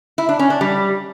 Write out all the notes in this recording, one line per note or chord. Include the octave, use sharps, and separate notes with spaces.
E4
D4
C#4
D4
G3